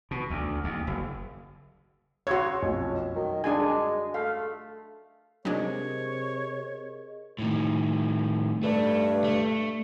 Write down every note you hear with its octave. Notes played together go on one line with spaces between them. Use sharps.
B2
D2
D#2
F#1
C#3 F#4 C#5 C6 E6 G#6
B1 F2 C#4
F#2 D#3
G#3 D4 G#4 G#5
A3 F5
C3 F#3 G#3 D4 G#4 A#4 C#5 D#5
A2 D#3
G2 A3
A3